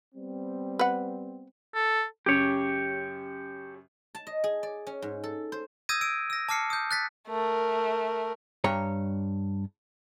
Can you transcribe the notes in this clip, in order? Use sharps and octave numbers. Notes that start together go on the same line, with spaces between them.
G3 B3 C4
B4 F#5
A4
F#2 C#3 G4 C#5
A5
D#5
G#4
D5
C#4
G#2
A4
C5
D#6 E6 G6 G#6 A#6 D#7
E6 D7
E6 A#6
A5 D6 F6 C7 C#7
D#6 G6
F#6 A6 B6
A3 A#4
G2 C#5 A#5